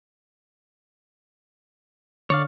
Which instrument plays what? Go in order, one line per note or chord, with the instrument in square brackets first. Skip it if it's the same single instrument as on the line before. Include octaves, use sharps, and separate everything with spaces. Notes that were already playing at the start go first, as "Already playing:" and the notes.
[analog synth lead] D3 [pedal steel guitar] C#5 D5 F5